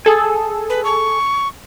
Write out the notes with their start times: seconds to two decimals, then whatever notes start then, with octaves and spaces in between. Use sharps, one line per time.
0.05 G#4 A4 G#5
0.70 B4
0.85 C#6